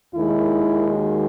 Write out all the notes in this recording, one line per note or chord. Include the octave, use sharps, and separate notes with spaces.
D#2 D#3 G#3 E4
F#4